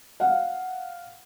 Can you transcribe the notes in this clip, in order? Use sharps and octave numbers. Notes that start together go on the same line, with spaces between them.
F5 F#5